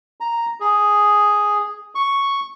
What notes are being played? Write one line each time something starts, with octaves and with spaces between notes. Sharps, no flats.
A#5
G#4
C#6